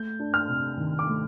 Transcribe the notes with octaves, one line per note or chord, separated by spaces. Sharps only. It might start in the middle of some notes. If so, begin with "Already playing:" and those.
Already playing: A3 G6
D4
F6
C3
D#3
D6
A3